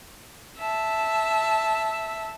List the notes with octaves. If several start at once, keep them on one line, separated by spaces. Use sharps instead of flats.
E5 A5